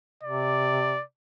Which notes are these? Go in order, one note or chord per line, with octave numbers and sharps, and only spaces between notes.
C3 D5